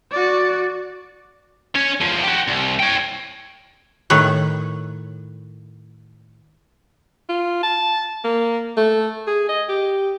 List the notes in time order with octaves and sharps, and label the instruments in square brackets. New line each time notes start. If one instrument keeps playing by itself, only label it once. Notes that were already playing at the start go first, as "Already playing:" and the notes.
[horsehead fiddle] F#4 D5
[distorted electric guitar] C#4 C#5
E2 F3
F#4 G4
C2
C#5 G5
[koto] A2 D#3 B4 C#5
[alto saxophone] F4
A5
A#3
A3
G#4
D#5
G4